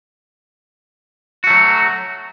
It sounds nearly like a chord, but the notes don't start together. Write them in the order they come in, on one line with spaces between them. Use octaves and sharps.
F#4 A3 F#3